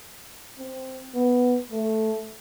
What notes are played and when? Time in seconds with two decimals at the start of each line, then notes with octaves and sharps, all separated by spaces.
0.59 C4
1.14 B3
1.71 A3